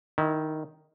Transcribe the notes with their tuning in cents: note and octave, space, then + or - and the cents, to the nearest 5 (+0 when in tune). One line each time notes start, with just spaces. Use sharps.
D#3 +0 E4 -20